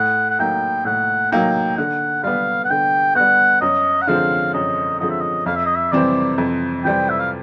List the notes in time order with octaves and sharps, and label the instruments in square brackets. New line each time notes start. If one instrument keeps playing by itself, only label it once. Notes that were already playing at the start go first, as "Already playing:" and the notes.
Already playing: [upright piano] A2 [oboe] F#5
[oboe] F#5
[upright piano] F#3 A#3 D#4 [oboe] G5
[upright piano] A2 [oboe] F#5
[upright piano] F#3 A#3 D#4 [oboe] G5
[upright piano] D3 [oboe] F#5
[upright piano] G3 B3 [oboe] F5
[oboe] F#5
[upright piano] D3 [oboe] G5
[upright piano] G3 B3 [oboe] F#5
[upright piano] F#2 [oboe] D#5
[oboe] F#5
[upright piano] D3 F3 G#3 C4 [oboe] F5
[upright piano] F#2 [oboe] D#5
[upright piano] D3 F3 G#3 C4 [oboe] D#5
[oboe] E5
D#5
[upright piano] F2 [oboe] F5
[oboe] E5
D#5
E5
[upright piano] C3 E3 G3 C4 [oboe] D5
[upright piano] F2
[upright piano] C3 E3 G3 C4 [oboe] G5
[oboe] E5
F5